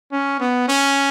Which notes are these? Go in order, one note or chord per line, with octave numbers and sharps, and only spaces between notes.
C#4
B3
C#4